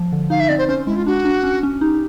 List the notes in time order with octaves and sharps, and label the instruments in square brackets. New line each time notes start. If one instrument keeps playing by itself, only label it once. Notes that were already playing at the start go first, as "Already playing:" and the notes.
Already playing: [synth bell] F3
D3
[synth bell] D#4 [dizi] F5
[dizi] E5
[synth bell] C4 [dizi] D5
[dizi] C5
[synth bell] C#4 [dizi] C5
[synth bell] G#3 [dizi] E4
[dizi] F4
[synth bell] D4 [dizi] F#4
[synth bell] D4
C#4
C#4
[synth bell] D#4 [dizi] G4